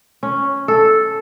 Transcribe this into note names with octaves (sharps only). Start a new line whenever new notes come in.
C#4
A4